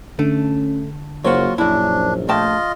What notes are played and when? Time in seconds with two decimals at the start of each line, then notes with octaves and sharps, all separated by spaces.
0.19 D3 A3 C#4
1.24 F#1 F#3 A#3 F4 F#4 C5 C#5
1.58 A#1 F#2 D4 E4
2.29 A3 F4 D#5 G5 A5